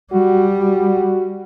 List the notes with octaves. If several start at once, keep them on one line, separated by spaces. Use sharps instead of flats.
G3 F#4
F#4